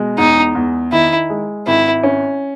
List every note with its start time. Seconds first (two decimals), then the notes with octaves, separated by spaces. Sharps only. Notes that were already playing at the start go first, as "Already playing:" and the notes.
Already playing: B2 G#3
0.18 E2 D#4
0.55 E2
0.92 D#3 E4
1.29 G#3
1.67 G#1 E4
2.03 C#4